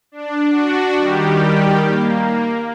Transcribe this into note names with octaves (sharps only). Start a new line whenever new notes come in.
D4
D4 F#4
D#3 G3 G4
A#3